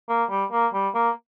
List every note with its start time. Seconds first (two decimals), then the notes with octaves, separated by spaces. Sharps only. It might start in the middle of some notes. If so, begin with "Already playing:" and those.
0.09 A#3
0.30 G3
0.52 A#3
0.74 G3
0.94 A#3